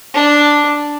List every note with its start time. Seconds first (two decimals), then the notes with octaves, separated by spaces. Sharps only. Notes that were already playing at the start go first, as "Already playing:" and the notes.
0.14 D4